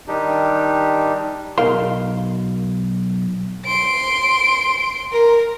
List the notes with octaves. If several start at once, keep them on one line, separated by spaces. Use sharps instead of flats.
D#3 G3 D4 D#4 G4
B1 A#4 F5 C6
C6 D7
A#4